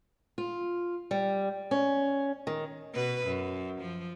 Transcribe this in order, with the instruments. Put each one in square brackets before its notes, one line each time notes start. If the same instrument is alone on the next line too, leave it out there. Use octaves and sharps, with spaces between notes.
[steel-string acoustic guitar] F4
G3
C#4
D#3
[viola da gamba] B2 B4
F#2
F3